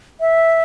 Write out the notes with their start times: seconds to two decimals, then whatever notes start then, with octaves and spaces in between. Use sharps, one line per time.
0.20 E5